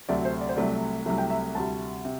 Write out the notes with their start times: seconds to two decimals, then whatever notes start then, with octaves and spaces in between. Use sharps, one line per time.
0.09 D2 C3 F#3 A3 D5
0.25 C5
0.41 D5
0.49 C5
0.56 C2 C3 F#3 A3 D5
1.06 C2 C3 F#3 A3 E5
1.18 G5
1.30 E5
1.55 D2 C3 G3 A5
2.05 C3